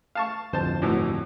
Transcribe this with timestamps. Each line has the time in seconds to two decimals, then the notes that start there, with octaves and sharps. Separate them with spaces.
0.15 F5 A5 C#6
0.53 D1 G1 F2 C5 A5
0.82 A2 E3 F#3